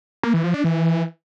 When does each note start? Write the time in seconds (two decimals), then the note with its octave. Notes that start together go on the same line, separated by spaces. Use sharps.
0.23 A#3
0.34 E3
0.44 F3
0.54 D4
0.64 E3